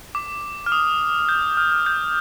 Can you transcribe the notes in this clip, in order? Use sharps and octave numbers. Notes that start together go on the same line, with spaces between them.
D6
F6
D#6
G6
F6
F6
G6